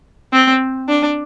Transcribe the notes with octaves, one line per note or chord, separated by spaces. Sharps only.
C4
D4